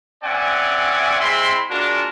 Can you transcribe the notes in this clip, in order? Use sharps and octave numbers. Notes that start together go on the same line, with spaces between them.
C4 C#4 D5 E5 F#5 G#5
G#3 C4 E4 B5 C6
G#3 A#3 D4 F4 F#4 A#4